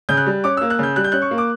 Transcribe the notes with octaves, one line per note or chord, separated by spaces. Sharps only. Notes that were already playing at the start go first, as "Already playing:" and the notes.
C#3 G6
F#6
G3
C#4 D6
E6
A#3
F#6
C#3 G6
G3 F#6
G6
C#4 F#6
C#6
A#3
D6